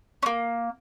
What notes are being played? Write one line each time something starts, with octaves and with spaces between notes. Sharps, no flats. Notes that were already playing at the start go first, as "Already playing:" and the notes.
A#3 C#4